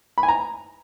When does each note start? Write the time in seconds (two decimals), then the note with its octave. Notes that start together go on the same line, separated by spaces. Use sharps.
0.18 B5
0.23 G#5
0.28 A#5